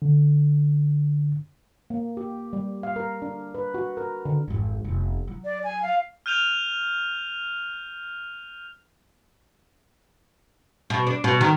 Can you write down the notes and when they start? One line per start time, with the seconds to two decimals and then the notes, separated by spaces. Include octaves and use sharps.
0.02 D3
1.90 A#3
2.17 G4
2.53 G3
2.83 F5
2.96 A#4
3.22 D4
3.55 B4
3.74 F#4
3.97 A#4
4.25 D3
4.48 G#1 F2
4.84 F1 B3
5.27 F#3
5.45 D5
5.64 G#5
5.82 F5
6.26 F6 G6 D#7 F7 G7
10.90 B2
11.07 D4
11.24 B2
11.41 D#3